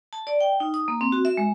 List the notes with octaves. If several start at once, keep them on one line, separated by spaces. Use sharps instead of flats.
A5
D5
G5
D#4
D#6
A#3
C4
F#4
E5
G#3